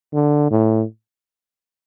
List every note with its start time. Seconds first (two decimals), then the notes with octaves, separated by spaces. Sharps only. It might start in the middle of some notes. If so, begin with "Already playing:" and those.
0.14 D3
0.51 A2